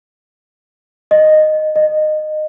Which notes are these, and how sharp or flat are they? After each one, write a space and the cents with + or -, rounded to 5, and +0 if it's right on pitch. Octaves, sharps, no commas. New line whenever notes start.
D#5 -10
D#5 -20